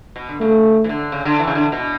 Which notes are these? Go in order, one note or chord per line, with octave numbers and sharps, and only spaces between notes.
B2
D3
C#3 A3
E3
D3
C#3
D3
E3
C#3
D3
B2